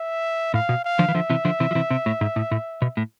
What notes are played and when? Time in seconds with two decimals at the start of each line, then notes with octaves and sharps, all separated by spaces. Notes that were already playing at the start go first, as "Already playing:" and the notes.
Already playing: E5
0.54 A2 F5
0.69 B2
0.85 F5
0.99 D3 F3
1.08 E3
1.15 D3 F3 E5
1.30 C3 E3
1.45 D3 F3
1.60 C3 E3
1.71 F3
1.75 C3 E3
1.90 C3
2.06 A2
2.21 G#2
2.36 A2
2.51 A2
2.82 B2
2.97 A2